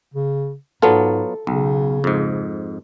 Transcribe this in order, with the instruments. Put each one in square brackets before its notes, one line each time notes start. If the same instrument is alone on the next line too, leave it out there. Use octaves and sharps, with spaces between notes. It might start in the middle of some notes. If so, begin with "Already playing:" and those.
[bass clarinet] C#3
[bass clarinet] G#2 [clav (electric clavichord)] F#3 B3 F4 [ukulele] A4
[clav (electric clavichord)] B1 [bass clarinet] C#3
[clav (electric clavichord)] F2 G#2